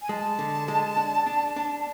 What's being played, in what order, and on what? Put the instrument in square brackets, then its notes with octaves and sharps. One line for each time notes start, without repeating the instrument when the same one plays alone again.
[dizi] G#5
[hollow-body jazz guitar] G#3 [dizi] A5
[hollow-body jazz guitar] D3
G#3
D4
D4
D4